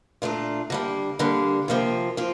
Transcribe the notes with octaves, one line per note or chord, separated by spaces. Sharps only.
A#2 A3 D4 F4
D3 G3 A#3
D3 G3 A#3
C3 F3 A#3 F4
F3 A#3 F4